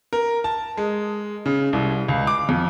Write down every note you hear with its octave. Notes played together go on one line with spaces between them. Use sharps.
A#4
A5
G#3
C#3
C2
C#2
D6
F2